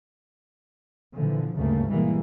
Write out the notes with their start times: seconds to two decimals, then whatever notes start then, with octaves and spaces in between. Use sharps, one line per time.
1.13 A#2 D3 E3 F3
1.54 G#1 D2 G2 C#3 A3 A#3
1.89 B2 E3 G3 G#3 A#3